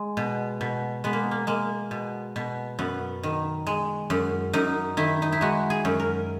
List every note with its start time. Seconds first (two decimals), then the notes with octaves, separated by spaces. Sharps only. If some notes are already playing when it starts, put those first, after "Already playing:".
Already playing: G#3
0.17 B2
0.61 B2
1.04 G#3 B3
1.13 A#3
1.31 A#3
1.47 G#3 A#3
1.91 B2
2.36 B2
2.79 F#2 B3
3.23 D#3
3.67 G#3
4.10 F#2
4.53 F#2 D#4
4.97 D#3 E4
5.22 D#4
5.32 E4
5.41 G#3 F#4
5.70 G#4
5.85 F#2
6.00 A#4